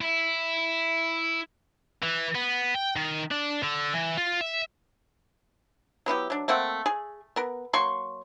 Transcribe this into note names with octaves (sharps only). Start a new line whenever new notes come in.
E4
E3
B3
G5
D#3
D4
D3
E3
F4
E5
F#3 B3 E4 G4
F#3 D4
A3 A#3 C4 F#5
G#4
B3 A#4
F#3 A#3 C6 C#6